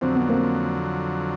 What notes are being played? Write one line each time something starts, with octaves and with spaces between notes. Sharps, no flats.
F2 D3 F#3 C4
B3
A#3 C4